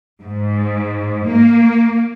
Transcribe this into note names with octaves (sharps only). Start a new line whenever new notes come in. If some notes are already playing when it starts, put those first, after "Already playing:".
G#2
A#3